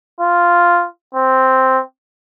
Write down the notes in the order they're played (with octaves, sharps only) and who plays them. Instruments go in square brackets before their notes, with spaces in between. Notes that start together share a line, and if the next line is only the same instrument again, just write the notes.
[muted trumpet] F4
C4